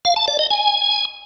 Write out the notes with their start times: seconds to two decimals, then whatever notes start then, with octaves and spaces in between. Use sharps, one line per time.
0.05 F5
0.16 A5
0.28 D5
0.39 D#5
0.51 G#5